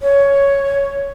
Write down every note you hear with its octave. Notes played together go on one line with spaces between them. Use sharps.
C#5